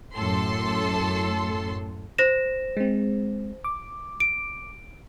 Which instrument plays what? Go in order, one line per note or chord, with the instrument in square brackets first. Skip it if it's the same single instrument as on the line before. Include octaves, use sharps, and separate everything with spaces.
[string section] F#2 A2 A4 C6
[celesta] C5 A#6 E7
[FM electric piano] G#3 C4
D6
[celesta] D7